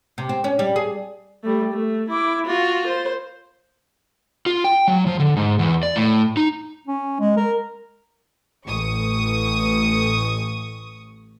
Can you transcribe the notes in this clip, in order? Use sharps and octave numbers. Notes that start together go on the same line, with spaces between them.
C3
C4
C#4
G3
G#4
G3 A3
A3
E4 D6
F4 F#4
C5
F4
G5
F#3
F3
D3
G#2
E2
D5
A2
D#4
C#4
G#3
A#4
A1 C#6 D#6